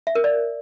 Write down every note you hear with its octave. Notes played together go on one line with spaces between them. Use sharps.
E5
A#4
D5